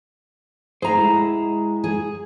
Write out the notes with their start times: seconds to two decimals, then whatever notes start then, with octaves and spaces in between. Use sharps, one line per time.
0.82 A3 G#4 C5 A#5
0.97 G#3 E4
1.84 G#4